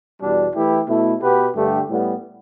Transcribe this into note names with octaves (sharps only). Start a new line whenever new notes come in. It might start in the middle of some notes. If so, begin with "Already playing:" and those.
E2 B2 G3 D4
E3 A3 E4 G4 B4
B2 A3 E4
B2 B3 G4 B4
G2 D3 A3 G4
A2 G3 B3